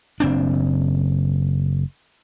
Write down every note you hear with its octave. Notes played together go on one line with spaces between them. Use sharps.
F#1 C4 D4